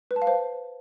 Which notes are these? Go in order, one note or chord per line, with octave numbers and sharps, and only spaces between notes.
B4
A5
F5
C5